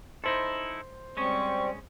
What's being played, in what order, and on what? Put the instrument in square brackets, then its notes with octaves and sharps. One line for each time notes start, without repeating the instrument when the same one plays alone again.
[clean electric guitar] D#4 E4 A4 [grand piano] C5 C6
[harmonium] G3 C4 [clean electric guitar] G#3 C#4 [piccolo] C#6